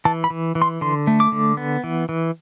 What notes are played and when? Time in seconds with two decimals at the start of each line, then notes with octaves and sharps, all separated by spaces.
0.05 E3 A5
0.24 B5
0.30 E3
0.55 E3
0.62 C6
0.81 D3 C6
1.07 A3
1.20 D6
1.32 D3
1.57 B3
1.84 E3
2.09 E3